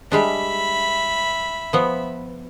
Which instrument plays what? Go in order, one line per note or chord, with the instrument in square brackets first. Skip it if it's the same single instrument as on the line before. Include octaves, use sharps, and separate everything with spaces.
[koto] G3 G#3 D4 [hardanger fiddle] E5 B5
[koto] F3 B3